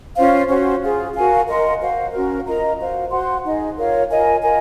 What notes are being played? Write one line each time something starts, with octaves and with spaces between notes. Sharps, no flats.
C#4 F4 C5 F5
C#4 F#4 C5
F4 G#4 C5
F#4 A#4 F5 G#5
A#4 D#5 F#5 C6
F#4 C5 F5
C#4 F#4 A#4
F4 A#4 D#5 A#5
F#4 C5 F5
F#4 C5 F#5 C6
D#4 G#4 D#5
F4 A#4 C#5 F5
F4 A#4 D#5 G#5
F4 A#4 D#5 G#5